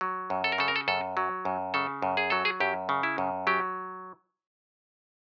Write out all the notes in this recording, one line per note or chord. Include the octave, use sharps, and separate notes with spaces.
F#3
F#2
A4
A#4
C#3 A4
A#4
A4
F#2 A4
F#3
F#2
C#3 A4
F#2
G#4
F#3 A4
G#4
F#2 G4
C#3
E4
F#2
F#3 G4